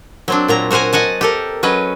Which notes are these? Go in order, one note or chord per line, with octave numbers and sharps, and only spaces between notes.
F#3 C4 D4
A#2 F#3 A#5
F#4 A#4 C5 F#5 G#5
D#5 F#5 G#5 A5
G4 A4 A#4
F#3 C#4 B4 D#5